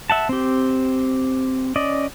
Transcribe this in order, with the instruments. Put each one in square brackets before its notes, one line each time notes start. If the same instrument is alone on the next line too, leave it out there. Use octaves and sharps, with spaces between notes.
[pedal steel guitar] E5 F#5 A5
C4 G4
C#4 D5 D#5